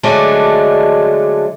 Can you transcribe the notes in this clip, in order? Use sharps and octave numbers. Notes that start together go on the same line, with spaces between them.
D3 F#3 G#3 A3 D4